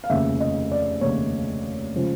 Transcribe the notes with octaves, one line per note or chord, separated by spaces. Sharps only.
F5
F1 D#2 C#3 E5
D#5
D5
F1 D#2 C#3 C#5
C#3 F3 G#3